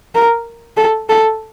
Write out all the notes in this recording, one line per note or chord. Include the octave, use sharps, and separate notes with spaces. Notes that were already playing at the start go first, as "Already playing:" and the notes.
A#4
A4
A4